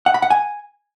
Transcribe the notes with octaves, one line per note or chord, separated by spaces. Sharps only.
F#5
B5
F#5
G#5